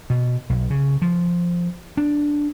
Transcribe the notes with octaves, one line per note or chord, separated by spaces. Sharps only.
B2
B1
C#3
F3
D4